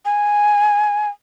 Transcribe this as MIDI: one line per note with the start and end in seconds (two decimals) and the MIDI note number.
0.05 1.08 80